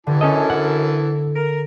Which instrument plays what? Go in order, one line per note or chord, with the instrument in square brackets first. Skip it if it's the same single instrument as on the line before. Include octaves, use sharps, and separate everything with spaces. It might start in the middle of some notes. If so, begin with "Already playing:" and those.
[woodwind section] G2 [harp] D3 [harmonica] E3 E4 A5
[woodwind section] F#2 [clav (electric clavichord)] C#4 A4 D#5
[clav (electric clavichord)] F#5
[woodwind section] A#4